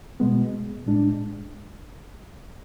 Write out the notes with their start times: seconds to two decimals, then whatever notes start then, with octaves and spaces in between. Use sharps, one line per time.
0.20 B2 G#3 B3
0.86 A2 G#3 D4